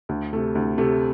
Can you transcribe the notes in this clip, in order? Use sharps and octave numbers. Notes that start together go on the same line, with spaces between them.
D2
C3 A3
D2
C3 A3